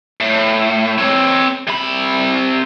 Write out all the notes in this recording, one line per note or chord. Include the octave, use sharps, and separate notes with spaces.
A2
C4 C#5
C3 B5